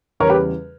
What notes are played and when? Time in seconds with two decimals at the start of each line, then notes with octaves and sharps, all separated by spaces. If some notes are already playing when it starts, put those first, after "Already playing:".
0.20 E2 C#3 G3 A#4 C#5
0.30 G4 B4